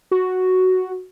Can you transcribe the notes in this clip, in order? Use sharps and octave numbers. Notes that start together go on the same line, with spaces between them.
F#4